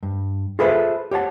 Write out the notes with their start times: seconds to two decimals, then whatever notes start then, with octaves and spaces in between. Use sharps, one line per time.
0.03 G2
0.59 F4 G#4 A4 B4 C5 E5
1.11 G4 C#5 F#5 A5